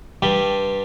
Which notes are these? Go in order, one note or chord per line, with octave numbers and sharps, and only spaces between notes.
G2 G3